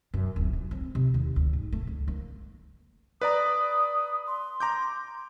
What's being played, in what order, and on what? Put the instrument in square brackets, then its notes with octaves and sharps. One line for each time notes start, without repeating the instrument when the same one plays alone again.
[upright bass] F#2
D1
C#2
C4
C3
D#2
D2
G#2
A3
C#2
A#3
[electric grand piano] B4 D5 A#5 [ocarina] D#6
[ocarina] C6
[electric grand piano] A#5 D6 G6